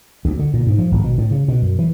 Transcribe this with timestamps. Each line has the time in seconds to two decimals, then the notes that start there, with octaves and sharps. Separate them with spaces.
0.25 D2
0.39 D3
0.54 A#2
0.67 G#2
0.78 F3
0.92 G#1
1.04 B2
1.18 A2
1.31 C#3
1.48 B2
1.62 F#2
1.79 E3